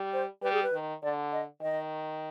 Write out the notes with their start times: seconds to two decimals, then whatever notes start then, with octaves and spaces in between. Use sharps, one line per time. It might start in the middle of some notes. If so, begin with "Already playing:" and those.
Already playing: G3
0.13 C5
0.42 G3 B4
0.53 G#4
0.63 B4
0.73 D#3
1.03 D3 D5
1.32 D#5
1.61 D#3 D#5